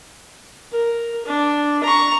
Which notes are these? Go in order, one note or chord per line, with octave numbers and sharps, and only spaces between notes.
A#4
D4
A#5 C#6